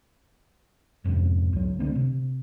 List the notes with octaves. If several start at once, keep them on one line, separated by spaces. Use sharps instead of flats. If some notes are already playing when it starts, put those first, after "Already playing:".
D1 F2 G#2 C3
C#2 F#3
D3 A3 C4
C3